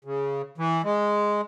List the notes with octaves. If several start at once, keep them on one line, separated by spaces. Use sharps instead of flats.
C#3
E3
G#3